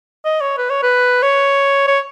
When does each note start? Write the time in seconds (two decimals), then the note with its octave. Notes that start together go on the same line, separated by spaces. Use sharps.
0.25 D#5
0.41 C#5
0.58 B4
0.70 C#5
0.83 B4
1.22 C#5
1.87 C#5